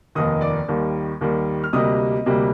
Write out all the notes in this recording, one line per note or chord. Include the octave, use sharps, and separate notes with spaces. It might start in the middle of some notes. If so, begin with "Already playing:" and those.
F1 D#2 D#3 D#5 D#6
D5 D6
D#2 D#3 G3
D#2 D#3 G3
F6
D2 C3 G3 A#3 D#5 D#6
D2 C3 G3 A#3